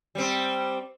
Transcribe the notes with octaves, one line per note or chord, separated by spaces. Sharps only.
G3 C4